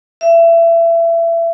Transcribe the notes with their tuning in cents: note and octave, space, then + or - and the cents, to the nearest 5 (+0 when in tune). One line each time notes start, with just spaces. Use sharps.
E5 +25